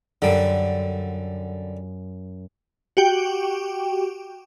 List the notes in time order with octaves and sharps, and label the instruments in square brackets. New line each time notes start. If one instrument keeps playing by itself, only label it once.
[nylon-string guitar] F#2 [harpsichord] D3 G3
[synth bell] F#4 G4 G5